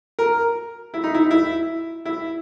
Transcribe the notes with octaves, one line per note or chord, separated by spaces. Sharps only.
A#4
E4
D#4
E4
E4
E4